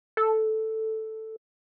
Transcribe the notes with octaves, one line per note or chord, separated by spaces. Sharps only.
A4